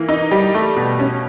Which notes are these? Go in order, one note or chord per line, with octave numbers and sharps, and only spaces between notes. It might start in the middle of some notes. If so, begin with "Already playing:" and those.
Already playing: E3 A#3
D#4
G3
A3
B2
C#4